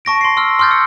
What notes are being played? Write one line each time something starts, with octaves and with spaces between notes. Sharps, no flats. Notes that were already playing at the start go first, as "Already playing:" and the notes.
A5 C#6 A#6 D7
C6 C7
C6 E6 F6
C6 D6 F6 G6 A6
E6 C#7